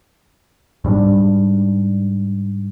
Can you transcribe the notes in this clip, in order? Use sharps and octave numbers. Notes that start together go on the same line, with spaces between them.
G#2 G3 C4 D4